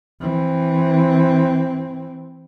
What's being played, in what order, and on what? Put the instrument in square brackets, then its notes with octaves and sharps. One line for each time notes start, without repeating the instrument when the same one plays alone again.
[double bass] E3 C4